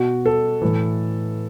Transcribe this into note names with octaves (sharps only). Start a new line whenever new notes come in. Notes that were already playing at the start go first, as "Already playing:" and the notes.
Already playing: B2 F#4
A4
A2 E3